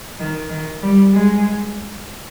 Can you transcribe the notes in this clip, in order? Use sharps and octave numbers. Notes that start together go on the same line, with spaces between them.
D#3
D#3
G3
G#3